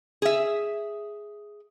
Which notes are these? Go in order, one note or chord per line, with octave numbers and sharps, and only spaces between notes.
G#4 E5